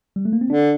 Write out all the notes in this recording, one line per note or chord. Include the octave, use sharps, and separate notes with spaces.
G3
A3
A#3
C4
D3 D4